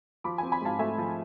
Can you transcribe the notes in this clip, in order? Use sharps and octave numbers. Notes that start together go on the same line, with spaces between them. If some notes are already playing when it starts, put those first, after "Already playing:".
F3 B5 D6
C4 G#5 B5
G#5 B5
G#2 F5 A5
A3 E5 G#5
F3